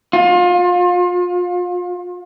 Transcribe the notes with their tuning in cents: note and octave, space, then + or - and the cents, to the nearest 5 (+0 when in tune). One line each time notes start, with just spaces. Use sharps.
F4 +30